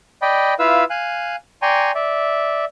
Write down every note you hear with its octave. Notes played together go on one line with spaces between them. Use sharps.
D5 D#5 G5 B5
E4 F4 B4 F5 E6
F5 G#5 F#6
D5 G5 G#5 A#5 C6 C#6
D5 E5